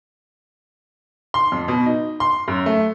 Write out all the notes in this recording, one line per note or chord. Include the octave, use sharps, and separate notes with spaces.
C6
F2
B2
D#4
C6
F#2
A3